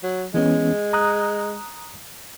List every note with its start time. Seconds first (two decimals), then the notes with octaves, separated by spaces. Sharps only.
0.03 F#3
0.34 E3 G#3 B3 C#4
0.93 A#5 D#6 F#6